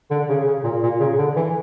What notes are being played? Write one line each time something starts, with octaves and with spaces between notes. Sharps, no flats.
D3
C#3
C#3
A#2
A#2
C#3
D3
E3